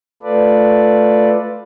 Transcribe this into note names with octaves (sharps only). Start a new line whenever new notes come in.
A3 F4 A4 B4 D5